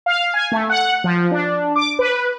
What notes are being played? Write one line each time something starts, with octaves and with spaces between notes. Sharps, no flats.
F5
G#5
A3
F#5
F3
D4
D6
B4